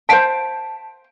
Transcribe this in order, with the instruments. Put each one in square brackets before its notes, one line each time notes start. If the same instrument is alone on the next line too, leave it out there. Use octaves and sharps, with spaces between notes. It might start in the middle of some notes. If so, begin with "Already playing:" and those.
[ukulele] C5 F5 G5 [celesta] A5 B6 D7